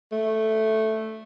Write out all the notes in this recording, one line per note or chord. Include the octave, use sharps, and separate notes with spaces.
A3